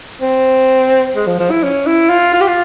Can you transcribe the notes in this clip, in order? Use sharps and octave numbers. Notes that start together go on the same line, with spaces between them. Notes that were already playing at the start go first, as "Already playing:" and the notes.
C4
G#3
F3
F3
E4
C#4
E4
F4
F4
G4
F4